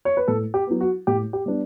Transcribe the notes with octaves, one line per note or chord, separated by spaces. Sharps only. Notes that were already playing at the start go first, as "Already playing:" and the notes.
C#5
B4
A2 A4
G4
F#3 B3
F#4
A2 G4
G4
G3 B3 D4